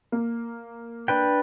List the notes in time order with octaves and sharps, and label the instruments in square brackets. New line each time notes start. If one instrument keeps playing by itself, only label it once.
[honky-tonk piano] A#3
[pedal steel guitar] D4 B4 G5